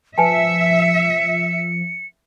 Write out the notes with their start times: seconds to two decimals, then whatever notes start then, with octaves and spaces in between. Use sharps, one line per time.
0.18 F3 B4 E5 G#5 A5 C#7